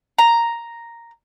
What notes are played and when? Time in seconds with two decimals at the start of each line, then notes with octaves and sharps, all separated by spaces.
0.18 A#5